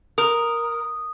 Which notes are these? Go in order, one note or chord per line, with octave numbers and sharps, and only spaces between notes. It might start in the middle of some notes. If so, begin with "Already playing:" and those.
A#4 D#6